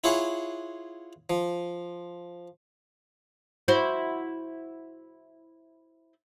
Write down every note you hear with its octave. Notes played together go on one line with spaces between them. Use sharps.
E4 F4 G#4 C#5 F#5 G#5
F3
E4 F#4 C5